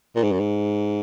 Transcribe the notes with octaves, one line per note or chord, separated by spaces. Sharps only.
A#2
G#2
F#2
G#2